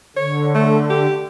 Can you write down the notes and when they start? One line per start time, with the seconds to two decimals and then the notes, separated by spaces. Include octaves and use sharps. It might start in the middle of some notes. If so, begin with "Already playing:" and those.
0.16 D3 C#5
0.55 A3
0.90 G4